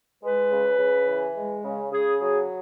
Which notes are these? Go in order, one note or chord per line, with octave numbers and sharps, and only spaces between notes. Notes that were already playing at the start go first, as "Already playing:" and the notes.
G#3 B4
C#3
C#3
E3
G#3
C#3
C#3 G#4
F#3 G#4